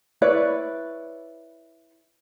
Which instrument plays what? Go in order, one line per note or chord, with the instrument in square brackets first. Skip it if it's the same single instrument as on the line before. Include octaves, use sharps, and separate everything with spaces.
[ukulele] E4 B4 C#5 D5